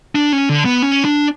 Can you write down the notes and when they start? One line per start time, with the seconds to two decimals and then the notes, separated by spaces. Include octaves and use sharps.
0.15 D4
0.33 C#4
0.49 D3
0.65 B3
0.83 C#4
1.05 D4